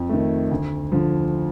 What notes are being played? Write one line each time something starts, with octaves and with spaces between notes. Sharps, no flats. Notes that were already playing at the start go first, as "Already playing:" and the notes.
Already playing: F2
D#3 A3
D2
D3 F3